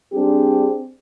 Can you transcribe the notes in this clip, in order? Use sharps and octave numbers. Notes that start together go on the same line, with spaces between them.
G3 C4 D4 G4 G#4